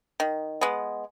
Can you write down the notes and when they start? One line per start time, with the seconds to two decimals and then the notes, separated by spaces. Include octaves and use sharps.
0.20 D#3
0.61 G#3 B3